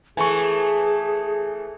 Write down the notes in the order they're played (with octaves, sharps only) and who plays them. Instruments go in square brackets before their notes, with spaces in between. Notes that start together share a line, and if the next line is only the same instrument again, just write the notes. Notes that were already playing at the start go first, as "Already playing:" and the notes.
[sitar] E3 A3 [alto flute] G#4 [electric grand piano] G#5 C#6